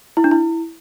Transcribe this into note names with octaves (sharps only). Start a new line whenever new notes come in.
E4
D4
E4